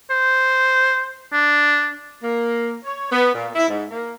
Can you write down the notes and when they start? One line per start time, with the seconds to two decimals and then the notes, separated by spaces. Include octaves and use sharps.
0.10 C5
1.32 D4
2.22 A#3
2.84 C#5
3.12 B3
3.33 A#2
3.55 E4
3.69 G#2
3.90 A#3